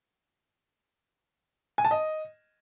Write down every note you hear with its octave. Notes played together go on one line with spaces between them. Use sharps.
G#5
A5
D#5